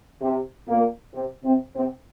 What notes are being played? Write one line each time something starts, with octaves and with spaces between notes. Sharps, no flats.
C3
A#2 A#3
C3 C4
C3 C4
C3 C4